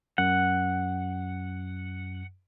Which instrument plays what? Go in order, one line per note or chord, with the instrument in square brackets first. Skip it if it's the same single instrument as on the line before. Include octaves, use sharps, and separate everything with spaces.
[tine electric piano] F#2 [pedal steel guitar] F#5